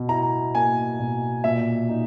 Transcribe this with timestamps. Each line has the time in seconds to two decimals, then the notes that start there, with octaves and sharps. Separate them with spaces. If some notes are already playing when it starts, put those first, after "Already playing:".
Already playing: B2
0.09 E4 A#5
0.55 A#3 G#5
0.99 B2
1.44 A#2 E5
1.89 D#4